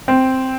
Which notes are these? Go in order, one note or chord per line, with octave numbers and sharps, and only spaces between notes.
C4